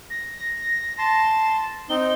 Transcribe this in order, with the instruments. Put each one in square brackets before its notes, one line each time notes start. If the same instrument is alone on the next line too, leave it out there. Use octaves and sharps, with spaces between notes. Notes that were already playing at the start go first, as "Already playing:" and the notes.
[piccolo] A#6
[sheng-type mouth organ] A5 C6
[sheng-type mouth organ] C4 D#4 [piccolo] G7